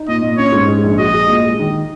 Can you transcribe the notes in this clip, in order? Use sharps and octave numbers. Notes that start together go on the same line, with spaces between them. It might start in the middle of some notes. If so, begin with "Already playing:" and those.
Already playing: D#4
A#2 D#5
A#2
C#4 C#5
G#2
G#3
A#1
F#4 D#5
G#3
A#2
G#3
D#3